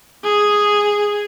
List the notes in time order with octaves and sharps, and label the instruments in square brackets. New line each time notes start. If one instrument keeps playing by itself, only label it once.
[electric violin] G#4